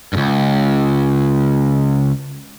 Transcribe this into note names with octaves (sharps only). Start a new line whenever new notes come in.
C#2 G2